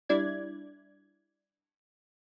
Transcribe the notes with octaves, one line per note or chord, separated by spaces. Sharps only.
G3 D4 E4 D5 G#6